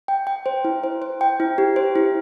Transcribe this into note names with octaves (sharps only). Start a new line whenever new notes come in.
G5
G5
C5
E4
C5
C5
G5
E4
G4
C5
E4